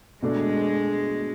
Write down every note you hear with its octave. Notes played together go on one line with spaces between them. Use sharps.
B2 G#3 A3 D4